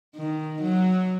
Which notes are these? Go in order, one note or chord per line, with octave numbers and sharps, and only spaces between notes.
D#3
F#3